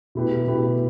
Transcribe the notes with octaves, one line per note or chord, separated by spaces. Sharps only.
B2 A3 E4 G4 B4
B2 A3 E4 G4 B4